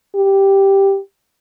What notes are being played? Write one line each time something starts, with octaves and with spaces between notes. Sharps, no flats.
G4